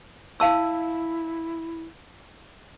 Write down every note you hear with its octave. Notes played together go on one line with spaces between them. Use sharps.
E4 F5 A5 E6